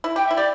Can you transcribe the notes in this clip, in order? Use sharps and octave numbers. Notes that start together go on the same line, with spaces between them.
E4
G4 G5
E4 E5
G4 D5